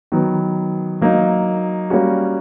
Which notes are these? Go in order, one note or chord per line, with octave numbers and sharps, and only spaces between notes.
D#3 F#3 B3
F#3 A#3 D#4
G3 A#3 C#4 F#4